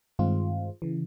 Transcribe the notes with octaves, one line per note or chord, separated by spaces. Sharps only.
G2 D#3 G#3 C4 F4
C#3 E3